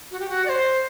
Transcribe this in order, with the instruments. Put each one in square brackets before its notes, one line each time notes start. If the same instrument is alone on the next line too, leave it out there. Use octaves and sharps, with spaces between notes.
[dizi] F#4
G4
F#4
D5
C5